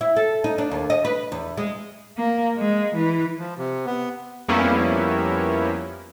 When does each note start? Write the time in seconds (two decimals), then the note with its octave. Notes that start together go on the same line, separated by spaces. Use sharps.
0.01 E4
0.16 A4
0.44 D#4
0.58 D4
0.71 D#2
0.90 D#5
1.05 B4
1.32 E2
1.57 G#3
2.17 A#3
2.56 G#3
2.95 E3
3.39 F3
3.58 C3
3.86 B3
4.48 F2 G3 A#3 B3 C#4 E4